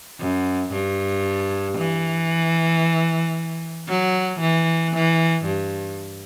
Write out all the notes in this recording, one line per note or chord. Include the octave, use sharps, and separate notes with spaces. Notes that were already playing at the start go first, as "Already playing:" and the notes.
F#2
G2
E3
F#3
E3
E3
G2